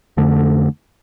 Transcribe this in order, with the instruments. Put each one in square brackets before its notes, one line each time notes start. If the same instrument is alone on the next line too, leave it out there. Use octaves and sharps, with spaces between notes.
[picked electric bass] F2 D3 A3